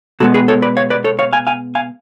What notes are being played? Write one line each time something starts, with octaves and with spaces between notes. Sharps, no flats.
B2 G#3 B3 F#4 A4
G#4 B4
A4 C#5
B4 D5
C#5 F5
B4 D5
A4 C#5
C#5 F5
F5 G#5
F5 G#5
F5 G#5